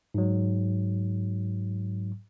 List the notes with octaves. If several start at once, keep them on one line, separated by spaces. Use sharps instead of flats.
G#2 F#3